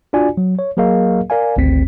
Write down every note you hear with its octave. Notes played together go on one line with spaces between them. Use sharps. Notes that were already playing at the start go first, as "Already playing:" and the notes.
D4 F4 F#4 D5 G#5
F#3
C#5
F#3 A#3 G#4 A#4 D#5 F5
A#4 D5 F5 G#5
G#1 D2 C4 B6